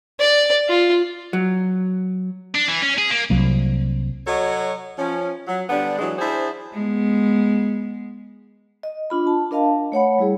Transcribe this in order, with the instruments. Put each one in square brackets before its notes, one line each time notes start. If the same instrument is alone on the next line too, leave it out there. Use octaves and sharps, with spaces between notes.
[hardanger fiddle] D5
F4
[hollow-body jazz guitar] F#3
[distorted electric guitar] D4
E3
C#4
G#4
A#3
[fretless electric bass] C2 F#3 A#3
[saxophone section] F#3 F#4 A4 C#5 D#5
F3 C#4
F#3
D3 G3 B3 D4
E3 F#3 G#3 D4 F#4
D4 E4 G#4 C5
[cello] G#3 B3
[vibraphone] D#5
D4 F4 B5
A5
D4 A#4 D#5 F5 A5
A3 C#5 F#5 B5
G3 E4 G#4